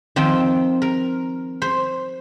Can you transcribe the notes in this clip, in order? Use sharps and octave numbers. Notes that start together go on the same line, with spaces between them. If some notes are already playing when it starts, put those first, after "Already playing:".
D#3 F3 C4 G5
A#4
C5